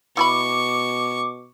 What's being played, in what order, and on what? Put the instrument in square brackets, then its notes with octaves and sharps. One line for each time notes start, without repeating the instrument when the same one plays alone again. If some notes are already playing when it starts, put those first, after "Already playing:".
[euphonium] B2 [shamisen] E4 A5 B5 [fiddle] C#6 [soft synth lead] D6